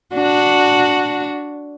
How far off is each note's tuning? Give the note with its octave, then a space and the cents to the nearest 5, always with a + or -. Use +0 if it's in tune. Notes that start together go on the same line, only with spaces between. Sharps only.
D4 +0 F#4 +0